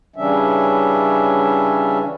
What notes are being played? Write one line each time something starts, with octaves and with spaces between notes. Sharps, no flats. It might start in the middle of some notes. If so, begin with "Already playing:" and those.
C#3 E3 G3 C#4 D4 E5